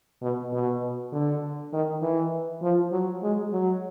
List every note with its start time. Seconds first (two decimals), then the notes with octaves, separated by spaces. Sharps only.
0.22 B2
0.53 B2
1.12 D3
1.73 D#3
2.02 E3
2.62 F3
2.92 F#3
3.23 G#3
3.53 F#3